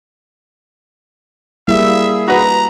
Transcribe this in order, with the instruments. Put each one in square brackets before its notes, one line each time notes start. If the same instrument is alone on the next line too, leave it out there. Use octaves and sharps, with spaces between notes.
[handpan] G3 A#3 E4 [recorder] G#4 [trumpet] E5
[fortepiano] F#4 B4 [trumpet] A#5